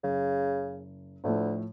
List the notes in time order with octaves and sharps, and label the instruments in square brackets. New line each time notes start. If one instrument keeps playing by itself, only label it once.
[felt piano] F#1 [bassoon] C#3
[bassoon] D2 [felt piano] A2 F3 A3